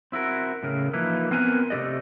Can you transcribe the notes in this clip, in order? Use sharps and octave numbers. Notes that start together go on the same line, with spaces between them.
C4 E4 F#4 A#4
A2 C#3 A#4
E3 F3 A#3 D#4 E4 B4
B3 C4 A#4 B4 G#5 A#5
C3 A3 B3 G4 D5 D#5